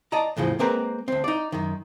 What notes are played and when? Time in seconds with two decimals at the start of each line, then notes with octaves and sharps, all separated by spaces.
0.12 D5 D#5 A5 A#5
0.37 E2 A2 C#3 F3
0.59 G#3 A#3 C4 A#4 B4 A#5
1.08 D2 C4
1.24 D#4 D5
1.52 F#2 D#3